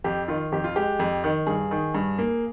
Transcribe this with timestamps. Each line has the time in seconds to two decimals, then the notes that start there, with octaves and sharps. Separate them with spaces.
0.04 F2 G4
0.28 D#3 F4
0.52 F2 G4
0.64 F4
0.76 G#3 G4
1.00 F2
1.24 D#3
1.47 G2 G#4
1.71 D#3
1.95 G2
2.18 A#3